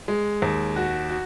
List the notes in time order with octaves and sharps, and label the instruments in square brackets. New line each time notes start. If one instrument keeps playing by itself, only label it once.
[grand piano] G#3
D#2
F#4
F#4